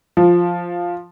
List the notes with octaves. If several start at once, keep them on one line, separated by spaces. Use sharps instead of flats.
F3